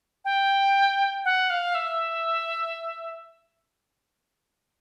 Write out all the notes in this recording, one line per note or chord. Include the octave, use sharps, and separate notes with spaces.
G5
F#5
F5
E5